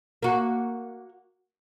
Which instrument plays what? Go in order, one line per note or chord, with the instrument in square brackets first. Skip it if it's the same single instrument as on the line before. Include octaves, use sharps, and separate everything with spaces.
[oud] A#3 F#4